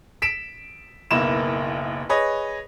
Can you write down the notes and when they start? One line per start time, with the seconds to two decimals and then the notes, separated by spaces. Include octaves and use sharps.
0.22 B6 D7 E7
1.11 F#1 B1 A#3 E4 B4 E7
2.09 G#4 B4 C#5 D#5